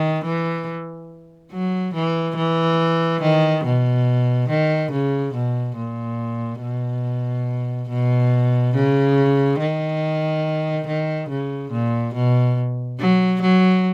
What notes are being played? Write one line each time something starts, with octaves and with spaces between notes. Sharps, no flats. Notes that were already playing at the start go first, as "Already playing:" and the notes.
Already playing: D#3
E3
F#3
E3
E3
D#3
B2
D#3
C#3
B2
A#2
B2
B2
C#3
D#3
D#3
C#3
A#2
B2
F#3
F#3